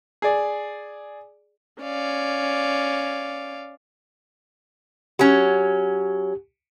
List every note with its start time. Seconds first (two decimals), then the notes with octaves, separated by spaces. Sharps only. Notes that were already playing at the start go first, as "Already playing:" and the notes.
0.22 G#4 D5
1.82 C#4 D5 F5
5.19 F#3 C#4 G4